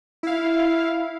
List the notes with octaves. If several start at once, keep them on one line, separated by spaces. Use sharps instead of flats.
E4 F5